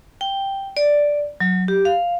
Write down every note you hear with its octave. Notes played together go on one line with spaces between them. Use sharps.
G5
D5
F#3
G4
F5